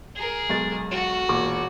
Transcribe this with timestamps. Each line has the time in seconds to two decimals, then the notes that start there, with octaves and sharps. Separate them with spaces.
0.16 G#4 A#4
0.49 B1 G#3 A6
0.91 F#4
1.29 E1 A#2 D6